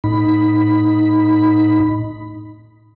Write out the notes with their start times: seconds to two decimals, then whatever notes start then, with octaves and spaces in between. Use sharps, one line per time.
0.04 A2 D#4 B5